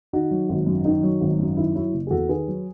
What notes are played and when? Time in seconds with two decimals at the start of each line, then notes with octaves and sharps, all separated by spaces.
0.13 D#3 D#4 F#4
0.31 F#3
0.49 G#1
0.67 F#2
0.85 D#3 D#4
1.03 F#3
1.21 G#1
1.39 F#2
1.57 D#3 E4
1.75 F#3 E4
1.94 F#1
2.07 G#4
2.11 E2 F#4 A4
2.29 D#3 G#4 B4
2.48 F#3